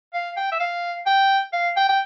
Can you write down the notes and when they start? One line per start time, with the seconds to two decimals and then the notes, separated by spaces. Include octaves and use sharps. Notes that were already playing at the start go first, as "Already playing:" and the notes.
0.14 F5
0.37 G5
0.52 E5
0.60 F5
1.06 G5
1.53 F5
1.77 G5
1.89 G5